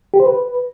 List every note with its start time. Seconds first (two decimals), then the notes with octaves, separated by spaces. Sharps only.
0.14 G4
0.20 C5
0.26 B4